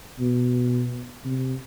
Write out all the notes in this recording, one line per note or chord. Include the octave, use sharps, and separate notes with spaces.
B2
C3